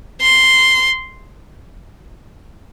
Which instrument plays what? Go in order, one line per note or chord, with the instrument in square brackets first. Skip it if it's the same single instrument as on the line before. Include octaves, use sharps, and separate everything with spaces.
[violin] C6